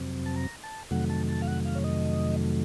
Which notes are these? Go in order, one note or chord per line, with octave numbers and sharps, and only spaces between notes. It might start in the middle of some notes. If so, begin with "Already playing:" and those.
Already playing: F2 C3 F#3 C4
A5
A#5
A5
F2 C3 D#3 F#3 A3 F#5
A5
A5
F5
F#5
F5
C#5
D#5